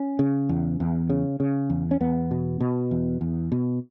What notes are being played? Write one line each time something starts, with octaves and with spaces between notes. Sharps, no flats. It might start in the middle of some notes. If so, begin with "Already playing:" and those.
Already playing: C#4
C#3
E2
E2
C#3
C#3
E2
C#4
E2 B3
B2
B2
E2
E2
B2